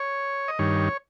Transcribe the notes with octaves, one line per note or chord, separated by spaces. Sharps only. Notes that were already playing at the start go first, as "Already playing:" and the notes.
Already playing: C#5
D#5
G2 D#3 C#5